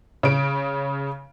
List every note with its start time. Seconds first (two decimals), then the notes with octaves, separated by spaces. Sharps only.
0.23 C#3 D7